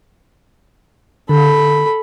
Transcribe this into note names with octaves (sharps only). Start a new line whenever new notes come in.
D3 A4 B5